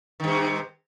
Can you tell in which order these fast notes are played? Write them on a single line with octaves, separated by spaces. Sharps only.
D#3 G2 C3